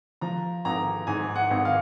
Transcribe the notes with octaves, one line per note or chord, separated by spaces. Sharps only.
F3 A#5
G#1 A#5
G#2 G#5
F#5
G#1
F5